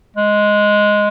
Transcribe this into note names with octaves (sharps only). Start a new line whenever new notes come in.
G#3